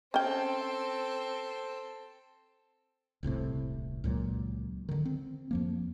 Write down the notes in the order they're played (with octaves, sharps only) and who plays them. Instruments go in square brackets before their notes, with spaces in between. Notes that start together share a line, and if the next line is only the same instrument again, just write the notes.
[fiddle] C4 A4 [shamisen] C#4 G5
[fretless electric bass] D#1 C2 A2 C3
C#2 A#2 F#3
D3 D#3
C4
F2 F3 A#3